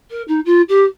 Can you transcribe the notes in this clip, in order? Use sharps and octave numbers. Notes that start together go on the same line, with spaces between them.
A#4
D#4
F4
G4